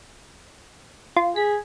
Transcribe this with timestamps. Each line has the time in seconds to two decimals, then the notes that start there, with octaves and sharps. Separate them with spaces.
1.17 F4
1.36 G#4 B6